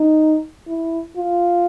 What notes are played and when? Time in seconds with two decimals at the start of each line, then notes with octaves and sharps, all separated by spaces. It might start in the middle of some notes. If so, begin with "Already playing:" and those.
Already playing: D#4
0.67 E4
1.17 F4